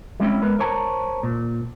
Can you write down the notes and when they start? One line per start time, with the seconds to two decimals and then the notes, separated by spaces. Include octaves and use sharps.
0.20 G3 G#3 C4 C#4 E4
0.42 G#3 B3 A#4 B4
0.59 A#4 C5 C#5 A5 A#5
1.23 A#2